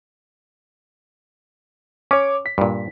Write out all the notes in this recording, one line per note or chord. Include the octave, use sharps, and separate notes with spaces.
C#4 C#5 D6
B6
G2 A#2